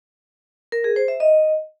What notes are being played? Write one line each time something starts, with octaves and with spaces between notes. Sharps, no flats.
A#4
G#4
C5
E5
D#5